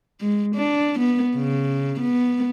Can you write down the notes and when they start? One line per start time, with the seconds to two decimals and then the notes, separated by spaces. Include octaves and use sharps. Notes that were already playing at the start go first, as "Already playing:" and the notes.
0.20 G#3
0.55 D4
0.99 B3
1.36 C#3
2.00 B3